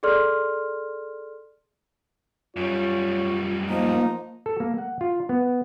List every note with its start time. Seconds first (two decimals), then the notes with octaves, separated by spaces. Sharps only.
0.03 G#4 A4 D5 C6 F6
2.57 F#2 G3 F4 C#5
3.69 F3 A#3 D#4
4.46 A4
4.60 A#3
4.78 F#5
5.01 F4
5.29 B3